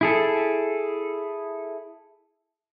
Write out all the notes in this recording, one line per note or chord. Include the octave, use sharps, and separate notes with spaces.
E4 G#4 A4